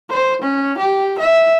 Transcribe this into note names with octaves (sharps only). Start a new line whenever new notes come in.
C5
C#4
G4
E5